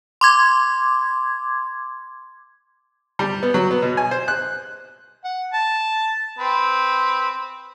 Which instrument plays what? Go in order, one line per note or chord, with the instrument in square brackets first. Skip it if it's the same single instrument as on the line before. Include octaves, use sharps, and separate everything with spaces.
[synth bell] C6 D6 G#6
[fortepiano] G3
B3
F#3
B3
B2
G#5
C5
F#6
[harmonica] F#5
A5
C4 B4